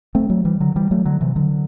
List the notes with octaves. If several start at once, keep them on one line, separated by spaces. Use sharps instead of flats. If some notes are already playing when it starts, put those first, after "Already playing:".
A3 C4
F#3 A3
E3 G3
D3 F#3
E3 G3
F#3 A3
D3 F#3
C3 E3
D3 F#3